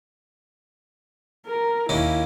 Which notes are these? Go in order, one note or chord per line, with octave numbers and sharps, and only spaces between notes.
A#4
D#2 A#3 C#4 E4